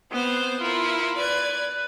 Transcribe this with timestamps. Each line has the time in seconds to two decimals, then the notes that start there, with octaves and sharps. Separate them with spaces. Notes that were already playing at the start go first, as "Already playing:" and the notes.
0.11 B3 C4 C5
0.60 E4 F4 A#4
1.17 B4 D5 G#6